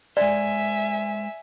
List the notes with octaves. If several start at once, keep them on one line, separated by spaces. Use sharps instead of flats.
G#3 C5 D5 E5 G#5